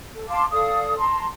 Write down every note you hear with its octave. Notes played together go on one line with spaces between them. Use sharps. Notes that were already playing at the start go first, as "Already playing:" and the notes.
A4
F5 A5 C6 D6
A4 D5 F5 D#6
A5 A#5 C6